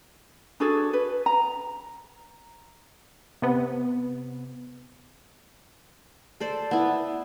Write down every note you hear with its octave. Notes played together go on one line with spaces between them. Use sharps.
D4 F#4 G#4 A4
B4
A#5
C3 B3
A4 C5 D5
B3 E4